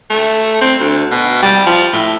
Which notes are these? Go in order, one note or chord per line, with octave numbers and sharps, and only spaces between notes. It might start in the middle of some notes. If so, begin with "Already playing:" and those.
A3
C4
D2
B2
G3
F3
A2